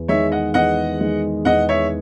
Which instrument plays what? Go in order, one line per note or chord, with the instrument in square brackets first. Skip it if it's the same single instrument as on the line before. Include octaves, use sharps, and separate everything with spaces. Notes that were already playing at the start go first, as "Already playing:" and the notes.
Already playing: [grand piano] E2
[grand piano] D#3 G#3 [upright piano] C#5 E5
[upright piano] D#5 F#5
[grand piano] E2 [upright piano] D#5 F#5
[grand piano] D#3 G#3
[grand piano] E2 [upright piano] D#5 F#5
[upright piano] C#5 E5